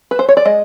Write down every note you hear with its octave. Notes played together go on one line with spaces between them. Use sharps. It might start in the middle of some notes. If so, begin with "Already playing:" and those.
B4
C5
C#5
D5
G#3 D#5